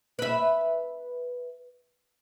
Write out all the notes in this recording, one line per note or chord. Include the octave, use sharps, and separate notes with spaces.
B4 E5